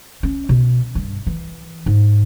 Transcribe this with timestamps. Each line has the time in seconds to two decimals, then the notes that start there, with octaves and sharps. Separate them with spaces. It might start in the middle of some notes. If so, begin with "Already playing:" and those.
0.23 C#4
0.49 B2
0.95 G2
1.27 E3
1.86 G#2